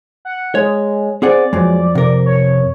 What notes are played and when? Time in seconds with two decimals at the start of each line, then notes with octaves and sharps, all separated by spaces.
0.25 F#5
0.55 G#3 C#5
1.22 C4 G#4 D5 F#5
1.53 F2 F#3 G#3
1.95 C3 A#4
2.26 C#5